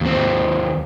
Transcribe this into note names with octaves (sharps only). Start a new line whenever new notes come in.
D#2 C4